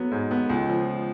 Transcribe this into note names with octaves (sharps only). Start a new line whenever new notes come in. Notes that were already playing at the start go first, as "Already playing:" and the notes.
Already playing: F#3 B3
G#2
B3
C#2
F3